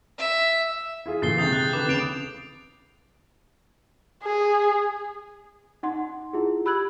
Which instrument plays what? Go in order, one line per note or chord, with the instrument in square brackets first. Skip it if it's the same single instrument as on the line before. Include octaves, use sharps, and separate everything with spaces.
[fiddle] E5
[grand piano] E4 F4 G#4
[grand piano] A#2 D3 E3 [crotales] A6 C7 G7
[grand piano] C3 D#3 G#3 [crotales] D#6 G6 A6
[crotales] F#6 G6
[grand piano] D3 B4 [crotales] D6
[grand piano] D1 C#3 [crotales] F#6 D7 F7
[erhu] G#4
[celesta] D#4 F#5 C6
E4 F4 G#4
G4 B5 E6 F#6 G#6 F#7